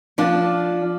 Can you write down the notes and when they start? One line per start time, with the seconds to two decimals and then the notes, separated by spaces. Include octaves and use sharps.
0.18 F3 D4